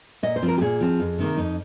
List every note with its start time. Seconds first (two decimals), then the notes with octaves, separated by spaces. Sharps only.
0.23 A#2 D#5
0.36 C5
0.43 F3 C4
0.48 A#4
0.58 G4
0.61 A#2 G#4
0.80 F3 C4
1.00 F2
1.18 C3 D#3 A#3
1.37 F2 D#4